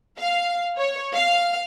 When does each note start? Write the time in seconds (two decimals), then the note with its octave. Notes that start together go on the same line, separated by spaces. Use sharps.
0.19 F5
0.77 C#5
1.14 F5